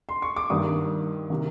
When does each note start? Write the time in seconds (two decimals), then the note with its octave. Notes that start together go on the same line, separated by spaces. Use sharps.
0.09 C6
0.22 C#6
0.36 D6
0.50 G2 D#3 D#6
1.30 C3 D#3